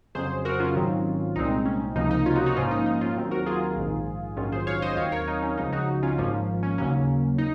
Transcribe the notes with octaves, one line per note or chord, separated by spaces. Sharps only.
F2 C#3 F#3 G#4 C5
F#4 A#4
C#4 F4
G#1 G#2 D#3 F#3 C4
C2 A#2 G#3 C4 D#4
C#4
C#2 C3 F3 A#3 D#4
D#4
C#4 F4
D#4 F#4
D#4 F#4
A#1 G#2 F3 A#3 C#4 F4
D#4
D#4
C#4 F4
D#2 D#3 F#3 C4
F#4 A#4
F4 G#4
A#1 G#2 D#3
A#1 G#2 D#3 F#3 C#4 F4
G#4 C5
C#5 F5
C5 D#5
D#2 D#3 F#3 C4 C#5 F5
A#4 C#5
D#4
C#4
C#2 C#3 F3 D#4
D#4 F#4
C#4 F4
G#1 G#2 F3 A#3 C#4
C#4
D#2 C#3 F#3 A#3 C#4
D#4